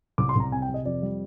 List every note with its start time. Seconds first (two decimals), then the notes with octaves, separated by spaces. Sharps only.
0.18 C2 D6
0.29 C6
0.36 C2 A#5
0.52 C3 G#5
0.62 G5
0.68 C3
0.74 D#5
0.85 F2 D5
1.02 G3